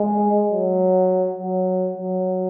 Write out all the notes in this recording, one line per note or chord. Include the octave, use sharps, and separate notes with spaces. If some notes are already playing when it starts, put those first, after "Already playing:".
Already playing: G#3
F#3
F#3
F#3